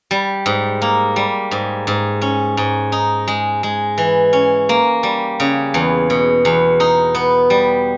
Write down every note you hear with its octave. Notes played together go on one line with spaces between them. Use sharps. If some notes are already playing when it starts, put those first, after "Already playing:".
G3
G#2
A#3
G3
G#2
G#2
C#4
G#2
D#4
G#3
G#3
E3
C#4
A#3
G3
C#3
E2
B2
E2
D#4
B3
G3